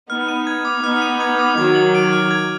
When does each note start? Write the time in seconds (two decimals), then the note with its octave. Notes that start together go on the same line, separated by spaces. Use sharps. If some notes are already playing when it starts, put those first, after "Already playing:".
0.10 B3 D#4 F6
0.28 D#7
0.47 G#6
0.65 D6
0.83 B3 D#4 F6
1.02 D#7
1.20 G#6
1.39 D6
1.57 D#3 F#3 G#6
1.75 F#7
1.95 D7
2.12 F6
2.31 G#6